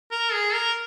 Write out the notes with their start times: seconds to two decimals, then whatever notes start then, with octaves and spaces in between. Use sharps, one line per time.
0.11 A#4
0.33 G#4
0.54 A#4